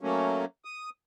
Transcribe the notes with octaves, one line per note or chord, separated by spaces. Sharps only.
F#3 A3 A#3 C#4
D#6